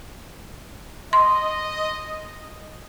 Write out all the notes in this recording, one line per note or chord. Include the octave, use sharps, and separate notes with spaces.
D#5 C6